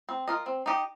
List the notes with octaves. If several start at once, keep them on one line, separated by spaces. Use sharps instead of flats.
C4
F4 A#4 D#5
C4
D#4 G4 D#5